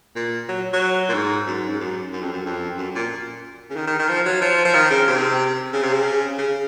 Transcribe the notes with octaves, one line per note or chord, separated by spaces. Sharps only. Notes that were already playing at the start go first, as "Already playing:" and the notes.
A#2
F#3
F#3
A#2
G#2
F#2
G#2
F#2
F#2
F2
F#2
F2
F#2
A#2
C#3
D#3
D#3
D#3
F3
F#3
F3
F3
D#3
C#3
C3
C#3
C3
C#3
C#3